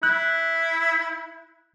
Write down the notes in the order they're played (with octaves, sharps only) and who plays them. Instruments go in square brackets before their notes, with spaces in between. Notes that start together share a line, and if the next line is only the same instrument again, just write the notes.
[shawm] E4 [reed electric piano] F#6